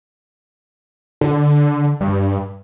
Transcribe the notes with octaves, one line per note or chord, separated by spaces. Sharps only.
D3
G2